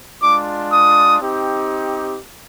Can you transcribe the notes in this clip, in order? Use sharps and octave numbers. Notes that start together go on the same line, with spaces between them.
G#3 D4 F4 D6
D#6
C4 D#4 G4